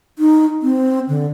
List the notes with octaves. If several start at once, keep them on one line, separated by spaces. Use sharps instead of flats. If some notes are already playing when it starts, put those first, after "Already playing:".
D#4
C4
D3